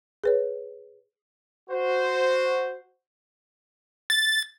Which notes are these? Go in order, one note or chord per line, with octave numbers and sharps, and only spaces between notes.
G#4 B4 C#5
F#4 C5
A6